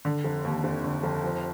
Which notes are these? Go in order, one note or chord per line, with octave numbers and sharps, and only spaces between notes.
D3
F1
D#2
F1
D3
F1
F3